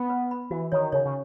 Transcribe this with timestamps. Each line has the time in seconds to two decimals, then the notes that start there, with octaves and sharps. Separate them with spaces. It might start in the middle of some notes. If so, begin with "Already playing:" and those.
Already playing: B3
0.10 B4
0.31 B5
0.51 E3 F#4
0.72 D#3 C#5
0.92 C#3 C#5
1.06 C#3